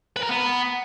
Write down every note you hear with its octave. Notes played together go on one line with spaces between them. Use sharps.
B4
A#4
B3